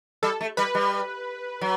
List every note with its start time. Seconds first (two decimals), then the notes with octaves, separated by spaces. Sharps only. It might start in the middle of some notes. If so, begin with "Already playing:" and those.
0.23 G3 A4
0.41 A3
0.57 G3 B4
0.75 G3
1.61 F#3